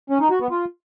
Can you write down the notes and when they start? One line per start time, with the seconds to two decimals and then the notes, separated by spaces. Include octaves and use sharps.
0.10 C#4
0.20 D#4
0.30 F#4
0.41 B3
0.51 F4